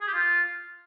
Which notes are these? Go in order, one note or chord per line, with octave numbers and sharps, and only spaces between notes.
G#4
G4
F4